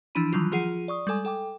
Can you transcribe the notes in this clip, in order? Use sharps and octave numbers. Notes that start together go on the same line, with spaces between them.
E3 F3 D4 E4 B5 D#7
D#3 E3 F#3 G3 F4
F3 F4 G#4 F#5 C7 D#7
D5 C#6 D#6
G3 G#3 A4 G#5 D#6
A4 G5 D6